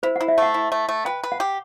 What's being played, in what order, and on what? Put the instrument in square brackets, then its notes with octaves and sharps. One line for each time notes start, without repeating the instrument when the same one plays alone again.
[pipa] E4 [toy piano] C5
[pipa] E4 [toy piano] F#5
[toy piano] E5
[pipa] A3 [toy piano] F#5
[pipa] E4
A3
A3
[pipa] B4 [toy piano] G5
[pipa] B4
[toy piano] F#5
[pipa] G4